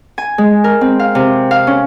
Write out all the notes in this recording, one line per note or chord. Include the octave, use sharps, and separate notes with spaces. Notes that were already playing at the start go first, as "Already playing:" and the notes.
G#5
G#3
A#4
C4
F5
C3
F5
C#4